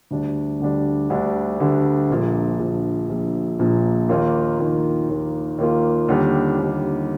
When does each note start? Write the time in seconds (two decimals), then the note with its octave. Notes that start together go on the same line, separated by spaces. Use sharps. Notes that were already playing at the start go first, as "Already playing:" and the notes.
0.11 D2 D3 G3 D4
0.60 D2 D3 G3 D4
1.10 D2 D3 G3 D4
1.60 D2 D3 G3 D4
2.10 A#1 A#2 F3
2.60 A#1 A#2 F3
3.09 A#1 A#2 F3
3.59 A#1 A#2 F3
4.09 D#2 D#3 A#3 F4
4.59 D#2 D#3 A#3 F4
5.09 D#2 D#3 A#3 F4
5.58 D#2 D#3 A#3 F4
6.08 D#2 D3 G3
6.59 D#2 D3 G3